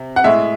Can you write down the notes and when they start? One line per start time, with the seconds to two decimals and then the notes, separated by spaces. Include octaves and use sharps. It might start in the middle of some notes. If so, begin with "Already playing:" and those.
Already playing: C3
0.16 F#5
0.24 A2 G#3 E5